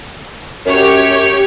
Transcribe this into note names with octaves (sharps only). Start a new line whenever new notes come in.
F#2 G4 C#5